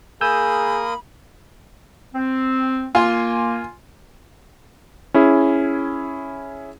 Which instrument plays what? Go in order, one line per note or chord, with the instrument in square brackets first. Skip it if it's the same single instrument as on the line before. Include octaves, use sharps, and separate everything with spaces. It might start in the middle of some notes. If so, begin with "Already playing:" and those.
[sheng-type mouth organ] A#3 A#4 D#6 [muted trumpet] G#4 [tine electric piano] G#5 E6 G6 [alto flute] B5
[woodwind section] C4
[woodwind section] A#3 [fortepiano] F4 [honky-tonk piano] G#5 C6
[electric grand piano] C#4 E4 G#4